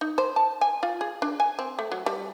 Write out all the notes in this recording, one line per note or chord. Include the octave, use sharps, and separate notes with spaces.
D#4
C5
A5
G#5
F4
G#4
D4
G#5
C4
A3
F#3
G3